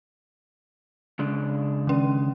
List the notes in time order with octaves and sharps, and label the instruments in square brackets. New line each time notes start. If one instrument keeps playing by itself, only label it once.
[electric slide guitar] C#3 G#3 D4
[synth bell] D#3 C#4